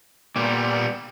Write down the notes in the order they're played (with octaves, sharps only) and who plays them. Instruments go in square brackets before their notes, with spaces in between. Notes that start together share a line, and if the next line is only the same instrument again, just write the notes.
[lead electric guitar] A#2 [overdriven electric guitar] G3 B3